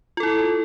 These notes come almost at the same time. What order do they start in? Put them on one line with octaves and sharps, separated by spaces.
F4 A4 E4